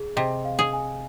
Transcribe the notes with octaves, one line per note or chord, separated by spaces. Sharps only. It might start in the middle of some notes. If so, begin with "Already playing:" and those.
Already playing: G#4
C3 D#5
F5
G#4
G#5